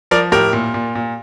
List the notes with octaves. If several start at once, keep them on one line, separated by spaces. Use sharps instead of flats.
F3 A#4 D5
A2 G4 A#4
A#2
A#2
A#2